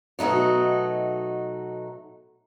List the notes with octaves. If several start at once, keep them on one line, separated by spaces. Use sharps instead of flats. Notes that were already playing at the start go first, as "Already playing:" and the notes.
B2 F#3 A3 D#4 F#4